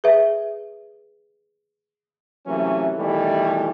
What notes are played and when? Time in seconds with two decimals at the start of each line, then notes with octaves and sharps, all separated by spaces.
0.04 G#4 B4 E5
2.47 C3 E3 F#3 A3 A#3 C#4
2.97 B2 D#3 E3 G3 A3